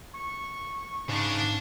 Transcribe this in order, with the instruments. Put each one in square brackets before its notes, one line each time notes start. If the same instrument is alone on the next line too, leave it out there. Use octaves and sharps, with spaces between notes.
[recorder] C#6
[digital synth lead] G#2 [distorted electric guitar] C#3 [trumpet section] D4